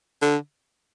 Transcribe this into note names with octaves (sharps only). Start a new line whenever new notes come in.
D3